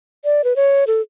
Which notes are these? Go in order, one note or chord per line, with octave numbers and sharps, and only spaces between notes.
D5
B4
C#5
A4